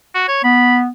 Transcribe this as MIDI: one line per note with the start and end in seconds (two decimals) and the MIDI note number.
0.15 0.27 66
0.28 0.42 73
0.44 0.89 59
0.44 0.78 83